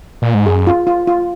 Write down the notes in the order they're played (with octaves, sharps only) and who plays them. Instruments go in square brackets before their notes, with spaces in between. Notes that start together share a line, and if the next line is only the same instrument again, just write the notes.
[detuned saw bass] A#2
G#2
[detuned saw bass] F#2 [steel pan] G#4
[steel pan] F4
F4
F4